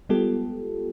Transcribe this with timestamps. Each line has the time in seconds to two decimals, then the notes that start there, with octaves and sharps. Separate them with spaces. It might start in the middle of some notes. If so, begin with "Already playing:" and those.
0.09 G3 G#3 B3 F4 G4 A4